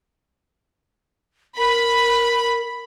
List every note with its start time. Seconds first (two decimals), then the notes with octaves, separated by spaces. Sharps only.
1.58 A#4 B5